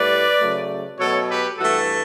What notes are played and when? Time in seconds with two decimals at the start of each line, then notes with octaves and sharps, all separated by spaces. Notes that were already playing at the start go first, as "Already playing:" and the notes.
Already playing: A2 G3 B4 D5
0.40 C#3 F#3 A3
0.98 B2 F#3 A3 A4 C#5
1.29 G4 B4
1.58 G2 E3 A3 F#4 A4